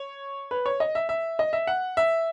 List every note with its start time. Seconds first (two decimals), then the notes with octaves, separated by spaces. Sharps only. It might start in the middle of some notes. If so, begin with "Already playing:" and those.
Already playing: C#5
0.51 B4
0.66 C#5
0.80 D#5
0.95 E5
1.09 E5
1.39 D#5
1.53 E5
1.67 F#5
1.97 E5